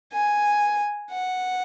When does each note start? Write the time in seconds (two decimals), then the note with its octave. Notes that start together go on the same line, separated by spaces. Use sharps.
0.13 G#5
1.12 F#5